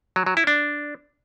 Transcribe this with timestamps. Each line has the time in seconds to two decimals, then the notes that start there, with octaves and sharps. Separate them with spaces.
0.16 F#3
0.26 F#3
0.37 E4
0.47 D4